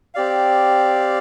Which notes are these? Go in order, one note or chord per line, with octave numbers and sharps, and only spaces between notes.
C4 G4 D5 F5